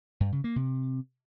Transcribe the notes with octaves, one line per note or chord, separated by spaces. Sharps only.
G2
C#3
A#3
C3